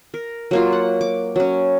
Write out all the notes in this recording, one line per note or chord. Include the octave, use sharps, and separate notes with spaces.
A#4
F#3 A#3 F4
F#5
D6
F#3 C#4